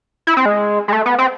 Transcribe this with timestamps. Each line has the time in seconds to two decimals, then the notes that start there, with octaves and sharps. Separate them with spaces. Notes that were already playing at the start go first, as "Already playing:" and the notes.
0.27 E4
0.37 C4
0.46 G#3
0.88 G#3
0.93 A3
1.06 B3
1.18 C4